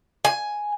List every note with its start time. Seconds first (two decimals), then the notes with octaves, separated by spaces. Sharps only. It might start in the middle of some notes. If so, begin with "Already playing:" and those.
0.25 G#5